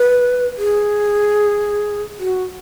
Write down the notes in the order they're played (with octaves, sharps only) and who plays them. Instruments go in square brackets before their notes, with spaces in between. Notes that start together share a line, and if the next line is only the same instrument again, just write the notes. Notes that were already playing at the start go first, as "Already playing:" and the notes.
Already playing: [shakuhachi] B4
G#4
F#4